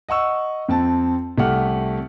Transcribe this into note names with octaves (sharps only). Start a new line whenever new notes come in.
D#5 F#5 C#6 E6
F2 C4 A5
C2 A3 G4 F#5 F6